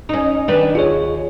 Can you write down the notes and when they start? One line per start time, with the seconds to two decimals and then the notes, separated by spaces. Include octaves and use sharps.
0.09 C#4 D#4
0.48 D#3 D4 B4
0.75 D#2 F4 G#4 C#5